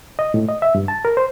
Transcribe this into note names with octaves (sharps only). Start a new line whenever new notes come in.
D#5
A2
D#5
E5
G2
A5
A#4
C5